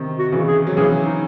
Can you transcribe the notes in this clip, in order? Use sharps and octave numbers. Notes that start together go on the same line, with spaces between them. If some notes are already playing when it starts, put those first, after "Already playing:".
Already playing: C3 D#3
F#4
C#3 E3
G#4
F#3
C#3 E3 G#4
D#4